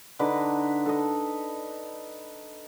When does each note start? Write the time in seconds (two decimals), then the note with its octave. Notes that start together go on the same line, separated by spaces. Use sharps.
0.19 D3 D#4 B4 D6
0.86 A4 D#5